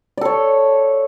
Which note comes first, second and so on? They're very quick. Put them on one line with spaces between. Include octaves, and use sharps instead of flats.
D5 A4 C#5